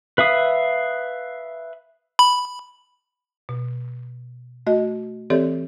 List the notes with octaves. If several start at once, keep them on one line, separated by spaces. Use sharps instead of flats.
B4 E5 F5 D#6
B5
B2
A3 F#4 D#5
E3 C4 G4 A4 C#5 D5